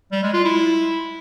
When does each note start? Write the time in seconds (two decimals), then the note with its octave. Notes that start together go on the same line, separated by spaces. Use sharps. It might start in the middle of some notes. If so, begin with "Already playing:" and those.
0.12 G3
0.23 G#3
0.34 F4
0.45 E4